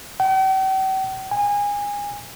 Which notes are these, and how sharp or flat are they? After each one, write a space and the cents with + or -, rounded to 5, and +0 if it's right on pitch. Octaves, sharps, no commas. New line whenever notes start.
G5 -45
G#5 -25